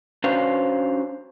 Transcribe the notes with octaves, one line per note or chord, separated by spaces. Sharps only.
C#4 D4 F#4 B4 C5 F5